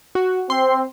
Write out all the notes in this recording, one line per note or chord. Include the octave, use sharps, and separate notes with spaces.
F#4
C4 C6